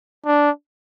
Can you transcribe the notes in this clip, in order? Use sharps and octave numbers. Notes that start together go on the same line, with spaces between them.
D4